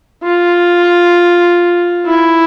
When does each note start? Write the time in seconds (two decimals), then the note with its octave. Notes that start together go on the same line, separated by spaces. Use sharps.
0.23 F4
2.06 E4